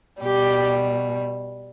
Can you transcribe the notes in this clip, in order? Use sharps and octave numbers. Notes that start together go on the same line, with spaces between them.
B2 G3 G4